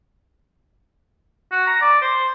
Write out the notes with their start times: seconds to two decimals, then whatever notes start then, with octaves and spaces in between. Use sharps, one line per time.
1.52 F#4
1.67 A#5
1.81 D5
2.02 C5